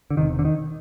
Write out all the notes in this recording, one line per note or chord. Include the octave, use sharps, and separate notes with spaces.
D3
E1 D2 C3 D#3
D3
D#3